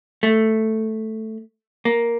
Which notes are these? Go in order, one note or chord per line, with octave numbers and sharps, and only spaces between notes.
A3
A#3